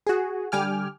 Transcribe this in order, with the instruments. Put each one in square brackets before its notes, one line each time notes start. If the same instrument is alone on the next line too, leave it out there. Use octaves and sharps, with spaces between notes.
[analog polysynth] F#4 G#4
D3 G3 G5 G#5 D6 F6